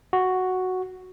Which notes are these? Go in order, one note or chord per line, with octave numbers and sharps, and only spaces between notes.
F#4